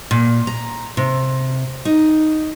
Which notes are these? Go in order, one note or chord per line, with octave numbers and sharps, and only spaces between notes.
A#2
A#5
C3
D#4